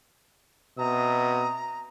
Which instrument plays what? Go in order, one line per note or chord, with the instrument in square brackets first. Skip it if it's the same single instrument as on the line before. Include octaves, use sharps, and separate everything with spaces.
[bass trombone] B2 [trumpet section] C4 E5 D#6 [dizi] A#5